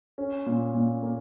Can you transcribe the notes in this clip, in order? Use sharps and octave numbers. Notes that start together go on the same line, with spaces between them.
C#4
A#2
A#2
A#3